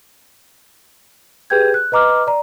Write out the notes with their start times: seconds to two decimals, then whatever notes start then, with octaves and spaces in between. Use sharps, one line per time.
1.50 G4 G#4 B4 G5 G6 G#6
1.74 F#6
1.92 B4 D#5 A#5 D6 F6
2.27 D5 A#5